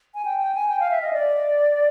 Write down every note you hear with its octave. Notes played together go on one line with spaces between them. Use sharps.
G#5
G5
G5
G#5
G5
F5
E5
D#5
D5